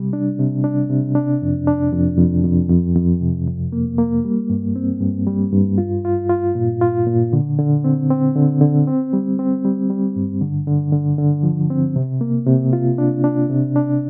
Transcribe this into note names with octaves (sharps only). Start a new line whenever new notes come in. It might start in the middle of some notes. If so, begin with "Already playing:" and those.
Already playing: C3 G3
D4
C3
D4
C3
D4
F2
D4
F2
F2
F2
F2
F2
C3
F2
A#3
A#3
G3
G2
C4
G2
G3
G2
F4
F4
F4
A#2
F4
A#2
D3
D3
C4
C4
D3
D3
C4
G3
C4
G3
G3
G2
D3
D3
D3
D3
F3
C4
C3
A#3
C3
F4
D4
D4
C3
D4